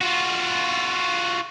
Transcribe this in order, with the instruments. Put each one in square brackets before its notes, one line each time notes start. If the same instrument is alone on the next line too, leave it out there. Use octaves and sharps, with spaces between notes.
[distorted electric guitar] F4 F#4